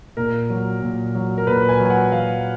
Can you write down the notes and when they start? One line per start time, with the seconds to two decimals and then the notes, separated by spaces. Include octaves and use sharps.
0.17 A#2 A#4
0.50 F#3
0.82 A#2
1.15 F#3
1.38 A#4
1.47 A#2 B4
1.69 G#5
1.80 F#3
1.86 G#5
1.90 F#5
2.12 F#3 F5